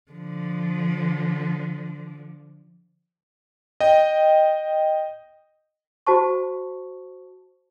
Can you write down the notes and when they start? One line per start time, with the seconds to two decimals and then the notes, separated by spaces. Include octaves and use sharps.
0.12 D3 F3
3.81 D#5 G5
6.07 F#4 C5 A5 C#6